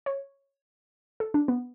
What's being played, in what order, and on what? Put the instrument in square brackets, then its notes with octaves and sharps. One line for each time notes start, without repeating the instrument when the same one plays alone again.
[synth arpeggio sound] C#5
A4
D4
B3